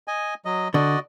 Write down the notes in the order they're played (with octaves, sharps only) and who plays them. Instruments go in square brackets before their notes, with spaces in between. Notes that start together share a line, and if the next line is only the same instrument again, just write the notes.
[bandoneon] D#5 G#5
F#3 D#5
[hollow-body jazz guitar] D3 [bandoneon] F#4 D5 D#5